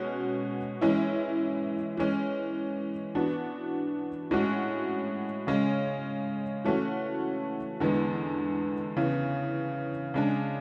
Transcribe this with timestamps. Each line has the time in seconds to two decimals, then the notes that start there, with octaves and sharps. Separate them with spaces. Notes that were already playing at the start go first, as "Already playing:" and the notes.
Already playing: B2 G#3 C#4 F#4
0.81 E3 G#3 C#4 E4
1.97 E3 G#3 C#4
3.15 E3 B3 D4 F#4
4.31 A2 G#3 C#4 F#4
5.47 C#3 G#3 C#4
6.65 E3 A3 C#4 F#4
7.80 E2 D3 G#3 B3
8.97 C#3 E3 B3
10.14 C#3 G#3 D4